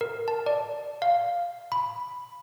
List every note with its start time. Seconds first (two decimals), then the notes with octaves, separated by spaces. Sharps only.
0.01 A#4
0.28 A5
0.46 D5
1.02 F5
1.72 B5